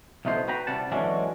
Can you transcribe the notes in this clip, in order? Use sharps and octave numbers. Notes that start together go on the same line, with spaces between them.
C2 B2 A3 B3 D#4 C5
F#4 B4 G5 A#5 B5
C2 C3 G3 F#5 A5
D3 E3 F#3 G#3 C#4 D4